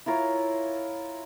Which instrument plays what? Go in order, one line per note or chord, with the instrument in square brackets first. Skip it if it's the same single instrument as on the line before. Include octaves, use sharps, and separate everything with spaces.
[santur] E4 F4 A#4 C#5